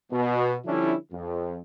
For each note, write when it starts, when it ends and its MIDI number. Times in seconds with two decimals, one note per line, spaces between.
0.12 0.57 47
0.65 0.94 50
0.65 0.94 53
0.65 0.94 55
0.65 0.94 61
0.65 0.94 62
0.65 0.94 64
1.12 1.60 41